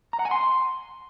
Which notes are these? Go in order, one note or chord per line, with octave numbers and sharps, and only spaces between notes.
A#5
F#5
G#5
C6